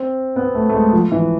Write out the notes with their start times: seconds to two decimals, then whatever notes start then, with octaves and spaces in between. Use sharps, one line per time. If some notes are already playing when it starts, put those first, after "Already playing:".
Already playing: C4
0.36 B3
0.55 A3
0.69 A3
0.74 G#3
0.93 F3
1.12 E3